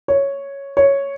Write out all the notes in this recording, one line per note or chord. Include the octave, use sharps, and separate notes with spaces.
C#5
C#5